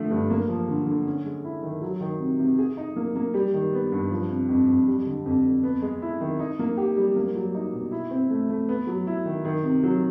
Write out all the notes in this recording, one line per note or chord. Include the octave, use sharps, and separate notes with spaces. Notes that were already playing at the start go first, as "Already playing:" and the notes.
Already playing: D3 F3 A3
G2
A#3
F3
D3
D3
C#4
G#3
E4
D#3
F#3
D#3
C3
C3
G#4
D#4
A#3
A#3
G3
D#3
B3
G2
F3
C3
F2
F2
G3
D3
F2
F2
B3
G#3
E4
D#3
D#4
A#3
G4
G3
A#3
F#3
D#4
B2
E4
C4
A3
A3
B3
F#3
E4
D#3
D#3
C3
F#3